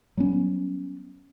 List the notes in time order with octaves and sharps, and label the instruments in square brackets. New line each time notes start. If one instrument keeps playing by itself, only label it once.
[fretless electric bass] F#3 G3 B3 C#4